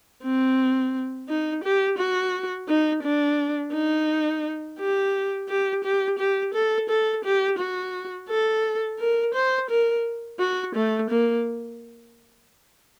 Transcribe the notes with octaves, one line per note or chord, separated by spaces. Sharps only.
C4
D#4
G4
F#4
D#4
D4
D#4
G4
G4
G4
G4
A4
A4
G4
F#4
A4
A#4
C5
A#4
F#4
A3
A#3